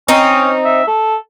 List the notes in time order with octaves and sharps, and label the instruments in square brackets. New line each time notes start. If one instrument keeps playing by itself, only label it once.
[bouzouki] C4 D#4 [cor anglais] C#4
[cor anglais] E5
A4